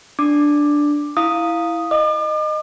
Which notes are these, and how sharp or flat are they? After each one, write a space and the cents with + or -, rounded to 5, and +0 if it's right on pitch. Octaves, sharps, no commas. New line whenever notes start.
D4 +0 D6 +10
E4 +0 F5 +0 D#6 +0
D#5 -15 D6 +40